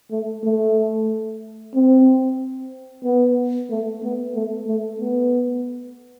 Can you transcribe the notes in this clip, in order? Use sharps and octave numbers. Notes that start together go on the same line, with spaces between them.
A3
A3
C4
B3
A3
B3
A3
A3
B3